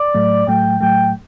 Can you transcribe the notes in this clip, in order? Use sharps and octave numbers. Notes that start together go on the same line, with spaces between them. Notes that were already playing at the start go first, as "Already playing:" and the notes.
Already playing: D5
A2 F#3 A3
A2 F#3 A3 G5
A2 F#3 A3 G5